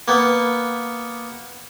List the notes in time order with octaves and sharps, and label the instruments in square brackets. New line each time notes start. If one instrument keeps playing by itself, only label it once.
[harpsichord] A#3 B3